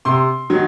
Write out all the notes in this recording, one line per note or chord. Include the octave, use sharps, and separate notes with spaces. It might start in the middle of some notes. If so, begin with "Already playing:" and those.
C3 C6
D#3 F#3